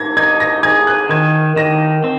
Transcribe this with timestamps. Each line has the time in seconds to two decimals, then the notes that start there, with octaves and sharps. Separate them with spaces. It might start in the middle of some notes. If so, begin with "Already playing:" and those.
Already playing: G#6 A#6
0.17 D#4 G#6
0.40 A#6
0.63 G#4 G#6
0.87 F#6
1.09 D#3 G#6
1.56 D#3 A#6
2.04 C4